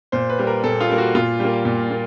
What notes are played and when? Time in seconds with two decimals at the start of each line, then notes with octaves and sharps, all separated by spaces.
0.12 A#2 C5
0.30 B4
0.39 G3 A#3
0.47 A#4
0.64 A#2 A4
0.80 F4
0.89 G3 A#3
0.98 F#4
1.15 A#2 F4
1.39 G3 A#3
1.65 A#2
1.90 A#3